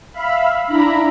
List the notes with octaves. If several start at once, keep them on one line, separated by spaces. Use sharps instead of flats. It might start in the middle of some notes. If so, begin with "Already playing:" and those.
E5 F5 B5
D4 E4 A#5 B5